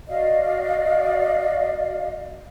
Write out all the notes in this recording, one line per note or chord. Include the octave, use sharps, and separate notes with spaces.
F#4 D5 D#5 F5